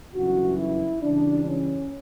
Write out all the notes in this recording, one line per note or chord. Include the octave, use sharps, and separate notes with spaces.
G1 F#2 C#3 E3 F#4
E4
C#2 C#3 E3 G3 D4
C#4